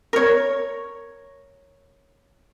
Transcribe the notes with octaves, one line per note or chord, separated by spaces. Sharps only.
A#4 C#5